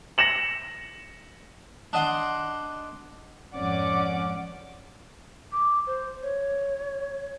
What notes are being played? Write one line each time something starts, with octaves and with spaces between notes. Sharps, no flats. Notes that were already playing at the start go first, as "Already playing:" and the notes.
A#6 C#7 E7 F#7
D4 D#5 F#5 C6
G#1 F2 C#4 D5 F#5 D6
D6
C5
C#5